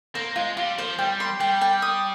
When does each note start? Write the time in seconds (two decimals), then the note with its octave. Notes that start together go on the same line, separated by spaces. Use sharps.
0.15 A#3 C5
0.36 G#3 F4
0.57 G3 F4
0.78 F3 C5
0.98 G3 G5
1.20 C6
1.40 G3 G5
1.61 G5
1.82 D#6